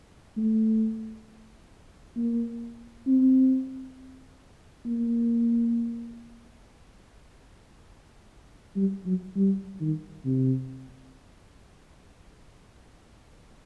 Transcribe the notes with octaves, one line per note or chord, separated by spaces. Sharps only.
A3
A#3
C4
A#3
G3
F#3
G3
D#3
C3